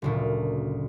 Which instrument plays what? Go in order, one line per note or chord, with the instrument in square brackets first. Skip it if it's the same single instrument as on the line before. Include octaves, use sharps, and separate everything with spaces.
[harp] F#1 D2 A#2